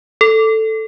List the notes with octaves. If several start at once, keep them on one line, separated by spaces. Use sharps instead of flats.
A4